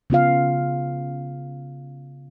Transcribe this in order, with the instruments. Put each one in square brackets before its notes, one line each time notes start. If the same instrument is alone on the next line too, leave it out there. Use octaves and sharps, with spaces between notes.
[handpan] C#3 B3 F4 F5